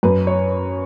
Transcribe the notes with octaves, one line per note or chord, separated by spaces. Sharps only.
F#2 B4
C#5